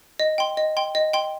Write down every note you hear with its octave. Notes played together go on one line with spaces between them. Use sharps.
D#5
G5 C6
D#5
G5 C6
D#5
G5 C6